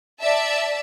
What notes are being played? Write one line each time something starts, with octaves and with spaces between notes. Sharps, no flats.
D5 E5 A5